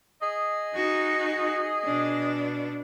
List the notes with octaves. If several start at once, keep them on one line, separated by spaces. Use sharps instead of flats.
G#4 D#5
D#4 F#4
B2 D4